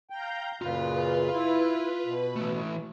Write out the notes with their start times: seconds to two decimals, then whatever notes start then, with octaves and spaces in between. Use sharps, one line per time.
0.10 F5 G5 A#5 G6
0.62 F#2 A#2 C#3 F4 B4 F5
1.33 E4
2.06 B2
2.36 E3 A3